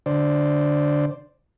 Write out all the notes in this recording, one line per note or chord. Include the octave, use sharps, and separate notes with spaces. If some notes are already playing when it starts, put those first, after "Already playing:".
D3 C5 D5